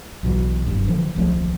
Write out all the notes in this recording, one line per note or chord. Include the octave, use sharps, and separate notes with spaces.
B1 B2 E3
F#1 G2
D3 E3 F3
D#1 C2 F3 A3